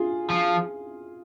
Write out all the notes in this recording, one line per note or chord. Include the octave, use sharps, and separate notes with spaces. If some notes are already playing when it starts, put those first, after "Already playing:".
Already playing: F4 G#4
F3